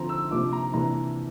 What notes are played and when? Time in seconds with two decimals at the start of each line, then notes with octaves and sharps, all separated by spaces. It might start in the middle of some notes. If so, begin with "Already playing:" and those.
Already playing: D3 F3 C4 A#5
0.09 E6
0.31 C3 F3 A#3 D4 D6
0.53 A#5
0.73 C3 E3 A#3 D4 A#5